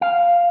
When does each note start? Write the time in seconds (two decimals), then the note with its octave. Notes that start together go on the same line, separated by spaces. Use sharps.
0.01 F5